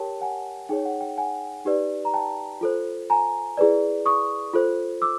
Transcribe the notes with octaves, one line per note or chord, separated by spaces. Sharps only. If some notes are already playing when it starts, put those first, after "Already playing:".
Already playing: G4 A#4 C#5 G5 A5
F#5 G#5
D#4 G#4 C#5 G5
F#5
G5
F#5 G#5
D#4 G4 B4 D5
A#5
G5 A5
F4 A4 C5
G#5 A#5
E4 G#4 B4 D5
C#6 D#6
F4 A4 C5
D6 E6